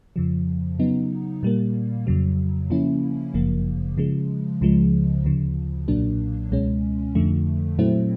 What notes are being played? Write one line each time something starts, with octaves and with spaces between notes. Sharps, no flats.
F2 C#3 F3
C#3 F#3 B3 D#4
A#2 G3 A#3
F2 C#3 F#3
C#3 F3 A#3 C#4 E4
G1 F#2 C#3 F3 A#3
C#3 F3 G#3
C#2 C#3 F3 G#3
D2 C#3 F3
B1 A#2 F#3 A#3 D4
C#2 B2 G#3 C#4
F2 D3 F3 A3
A#2 F#3 A3 C4 E4